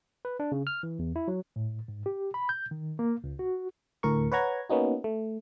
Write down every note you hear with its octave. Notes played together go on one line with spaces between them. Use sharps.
B4
D4
C#3
F6
E3
E2
E4
F#3
A2
G#2
G4
B5
G6
D#3
A#3
C#2
F#4
D2 A2 A#4 C#6
B4 C#5 F#5 A#5 G#6
A#3 B3 C#4 D#4 F#4
A3